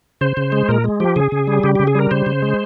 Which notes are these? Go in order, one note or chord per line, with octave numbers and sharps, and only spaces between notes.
C#3 C5
C#3
G#3
A#2 A#4
G#3
F3 G4
C#3 G#4
C#3
G3
C#3 G4
C#3 G4
G#4
G3 A#4
C#3 C5
C#3
G#3